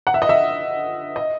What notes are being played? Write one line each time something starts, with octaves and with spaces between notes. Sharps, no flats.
F#5
E5
D#5
E5
D#5